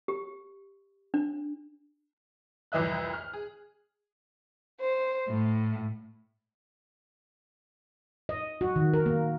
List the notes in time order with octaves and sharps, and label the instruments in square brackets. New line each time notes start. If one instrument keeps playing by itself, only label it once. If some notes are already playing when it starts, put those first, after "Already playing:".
[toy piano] G4
D4
[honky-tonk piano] C2 F2 E3 D#5 E5 F#6
F6
G#4
[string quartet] C5
A2
[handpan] D#5
F#4
D#3
A#4
A#3